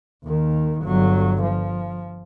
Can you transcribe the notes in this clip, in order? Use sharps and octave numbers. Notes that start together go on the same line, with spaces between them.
D#2 D#3
G1 F#3
F3